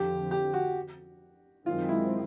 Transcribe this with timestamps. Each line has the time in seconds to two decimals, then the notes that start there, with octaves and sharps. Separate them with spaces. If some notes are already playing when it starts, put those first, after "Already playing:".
Already playing: F2 D3 F3 G4
0.31 G4
0.53 F#4
1.66 F#2 D#3 G#3 C4 F4
1.89 E4